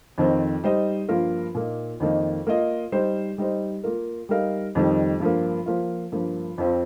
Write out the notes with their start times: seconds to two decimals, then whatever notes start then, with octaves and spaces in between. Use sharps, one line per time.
0.18 F2 D#3 C4
0.64 G3 D#4 C5 D#5
1.09 G2 F3 A#3 F4 A#4
1.55 A#2 A#3 D#4
2.00 F2 D#3 A#3 D#4
2.47 A#3 F4 D#5
2.92 G3 D#4 C5
3.38 G3 D#4 C5
3.84 A#3 F4 A#4
4.29 G3 D#4 A#4 F5
4.75 F2 D#3 G3 D#4
5.20 G2 F3 A#3
5.66 F3 A#3 F4
6.12 G2 F3 A#3
6.58 F2 F3 C4